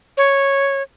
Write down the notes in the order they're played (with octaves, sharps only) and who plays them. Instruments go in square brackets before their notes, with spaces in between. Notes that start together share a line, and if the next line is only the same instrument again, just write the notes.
[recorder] C#5